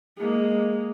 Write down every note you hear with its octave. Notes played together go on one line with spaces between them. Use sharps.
G#3 A#3